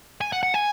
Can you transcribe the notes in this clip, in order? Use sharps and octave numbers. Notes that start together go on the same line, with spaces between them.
G#5
F#5
F#5
G#5